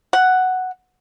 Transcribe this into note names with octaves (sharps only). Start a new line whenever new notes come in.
F#5